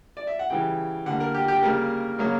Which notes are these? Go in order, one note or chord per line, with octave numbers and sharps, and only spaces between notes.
D5
E5
F#5
C#3 E3 G3 G5
D3 G3 A#3 F#5
A#4
G4
G4
C#3 G3 A#3 A#4
C#3 F#3 A#3